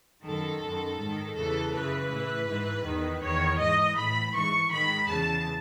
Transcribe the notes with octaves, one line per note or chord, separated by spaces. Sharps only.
F#2 D#3 A4
F#2 D#3
G#2 D#3
E2 C#3 E3 A4
F#2 C#3 E3 B4
A2 E3
G#2 E3
E2 D#3
E2 D#3 C#5
G#2 E3 D#5
A2 E3 B5
G#2 E3 C#6
G#2 D#3 B5
E2 C#3 E3 A5